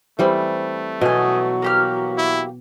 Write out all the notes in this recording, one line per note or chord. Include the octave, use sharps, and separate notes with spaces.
E3 G3 A3 C4
B2 E3 F#3 F#4 D#5 G#5
A#3 G4 F6
E4